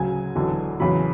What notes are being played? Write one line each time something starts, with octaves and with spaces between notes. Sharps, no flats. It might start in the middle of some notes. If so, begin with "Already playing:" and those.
Already playing: D2 C#3 F#3 G#5
E1 E2 D3 F#3
E2 C#3 F#3 B5